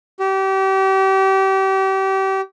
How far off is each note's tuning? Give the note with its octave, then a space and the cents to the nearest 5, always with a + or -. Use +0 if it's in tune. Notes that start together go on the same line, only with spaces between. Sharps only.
G4 -35